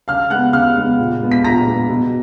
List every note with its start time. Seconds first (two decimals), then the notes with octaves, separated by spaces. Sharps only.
0.08 C#3 F5 F6
0.30 G#3 B3 F#5 F#6
0.53 C#3 F5 F6
0.76 G#3 B3
0.98 A#2
1.21 G#3 B3
1.32 B6
1.44 A#2 A#5 A#6
1.67 G#3 B3
1.90 B2